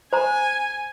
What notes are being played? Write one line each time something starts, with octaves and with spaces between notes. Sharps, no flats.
C5 G#5 A#5